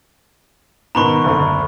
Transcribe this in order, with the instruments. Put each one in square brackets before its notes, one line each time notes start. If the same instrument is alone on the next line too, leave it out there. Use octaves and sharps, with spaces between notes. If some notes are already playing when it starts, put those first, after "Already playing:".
[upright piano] G#2 B2 D#3 [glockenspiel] A#5 B5 C#6
[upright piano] F#1 D2 D3